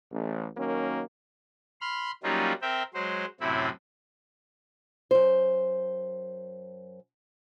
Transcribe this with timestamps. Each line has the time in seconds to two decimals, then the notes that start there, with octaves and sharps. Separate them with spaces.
0.11 A1
0.56 D#3 F#3 A#3 C#4
1.81 B5 C6 F6
2.23 F#3 G3 A#3 C#4 D#4 F4
2.62 C4 A#4 E5 G5
2.94 F#3 G#3 C5
3.40 F#2 A2 C3 C4 E4
5.11 F#2 C5